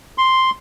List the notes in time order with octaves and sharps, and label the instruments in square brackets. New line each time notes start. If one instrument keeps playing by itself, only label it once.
[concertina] C6